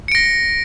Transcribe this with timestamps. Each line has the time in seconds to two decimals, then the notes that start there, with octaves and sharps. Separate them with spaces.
0.08 C#7
0.12 D7
0.15 A#6